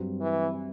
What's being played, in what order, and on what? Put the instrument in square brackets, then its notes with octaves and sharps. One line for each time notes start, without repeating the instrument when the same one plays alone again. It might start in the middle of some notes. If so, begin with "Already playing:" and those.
Already playing: [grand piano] G2 F#3 C4
[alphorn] E3